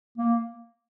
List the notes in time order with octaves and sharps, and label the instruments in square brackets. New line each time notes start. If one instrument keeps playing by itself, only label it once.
[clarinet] A#3